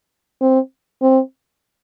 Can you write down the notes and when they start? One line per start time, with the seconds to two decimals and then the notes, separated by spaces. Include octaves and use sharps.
0.41 C4
1.02 C4